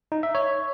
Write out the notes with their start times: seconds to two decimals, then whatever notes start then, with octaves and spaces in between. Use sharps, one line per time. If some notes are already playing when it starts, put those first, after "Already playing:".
0.12 D#4
0.23 E5
0.35 C#5